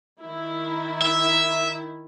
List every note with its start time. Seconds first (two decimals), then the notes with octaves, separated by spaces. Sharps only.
0.19 D#3 E4
1.02 E5